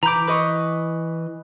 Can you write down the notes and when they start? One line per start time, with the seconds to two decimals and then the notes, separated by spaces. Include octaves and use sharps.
0.03 E3 A#5 B5 D6 G6
0.27 B4 D#5 C#6